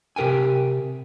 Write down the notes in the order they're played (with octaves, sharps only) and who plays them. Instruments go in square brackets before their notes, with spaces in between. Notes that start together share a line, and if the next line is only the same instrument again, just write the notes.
[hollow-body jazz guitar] C3 G4 A#4 G5 G#5